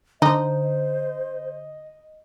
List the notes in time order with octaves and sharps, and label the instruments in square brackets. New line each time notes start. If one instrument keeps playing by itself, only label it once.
[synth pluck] D3 [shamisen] D#4 [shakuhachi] C5 [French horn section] D#5